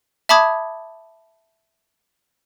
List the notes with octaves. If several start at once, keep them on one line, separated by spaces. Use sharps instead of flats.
E5 A5 B5 D6 D#6 G#6